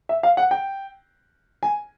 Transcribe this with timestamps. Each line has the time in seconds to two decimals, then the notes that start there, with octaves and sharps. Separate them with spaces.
0.09 E5
0.23 F5
0.37 F#5
0.51 G5
1.63 G#5